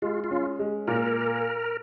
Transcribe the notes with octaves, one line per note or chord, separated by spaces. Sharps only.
G#3 F4
F4
C#4
G#3
A#2 A#4